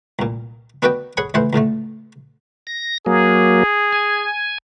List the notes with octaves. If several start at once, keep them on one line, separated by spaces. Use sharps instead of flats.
C2 A#2
B3 D4 F#4 B4 D#5 G5
G#4 C#5 F#5 G#5 B5 C#6
C#2 A2 E3 E4 C5 F#5
C#2 A2 D3 A3
A#6
F#3 A#3 G#4
G#5